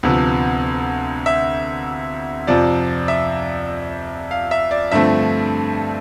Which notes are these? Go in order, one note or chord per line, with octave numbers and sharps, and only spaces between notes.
D2 C3 F3 B3
E5
F2 C3 F3 D5
E5
F5
E5
D5
G2 D3 F3 A3 C4 E5